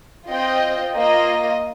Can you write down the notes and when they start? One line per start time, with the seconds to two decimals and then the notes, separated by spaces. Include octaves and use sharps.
0.28 C4 F4 D#5 G5
0.94 A#3 F4 D#5